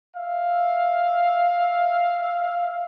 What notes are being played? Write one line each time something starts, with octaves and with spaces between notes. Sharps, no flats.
E5 F5